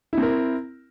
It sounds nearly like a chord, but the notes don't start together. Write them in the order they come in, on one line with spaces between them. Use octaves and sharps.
E4 C4 A#4